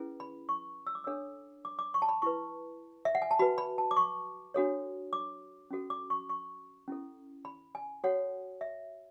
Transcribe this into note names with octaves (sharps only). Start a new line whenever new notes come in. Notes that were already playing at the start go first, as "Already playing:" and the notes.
Already playing: C#4 E4 G#4 B4
B5
C#6
E6
D6
D4 A4 C#5 E6
D6
D6
C#6
A5
B5
E4 B4 C#6
E5
F#5
G#5
A5
F#4 B4 B5
B5
A5
D6
C#6
D4 F#4 A4 C#5
D6
C#4 F#4 A4
D6
C#6
C#6
C#4 E4 A4
B5
G#5
F#4 A4 C#5 F#5
E5